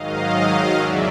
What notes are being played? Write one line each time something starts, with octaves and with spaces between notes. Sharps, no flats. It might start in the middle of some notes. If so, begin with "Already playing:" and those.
Already playing: G#2 D#3 F#3 D#5 F5
E2 C#3 F#3 D5 E5